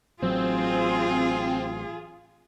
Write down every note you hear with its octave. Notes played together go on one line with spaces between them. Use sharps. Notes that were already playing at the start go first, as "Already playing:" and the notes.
A1 F#3 C4 F4 G#4